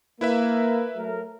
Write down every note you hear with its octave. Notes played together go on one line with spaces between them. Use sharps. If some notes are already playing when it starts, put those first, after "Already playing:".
A#3 E4 B4 E5
F#3 A3 A#4